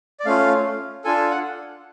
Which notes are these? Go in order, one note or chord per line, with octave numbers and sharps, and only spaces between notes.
D5
A3 C#4 F4 F5
D4 F4 A4 G#5
F#5